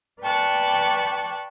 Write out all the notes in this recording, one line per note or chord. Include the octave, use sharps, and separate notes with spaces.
B4 D5 G5 A5 C#6 F#6